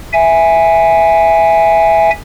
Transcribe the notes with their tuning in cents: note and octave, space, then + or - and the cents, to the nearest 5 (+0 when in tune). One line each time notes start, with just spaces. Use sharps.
E5 +0 G#5 -5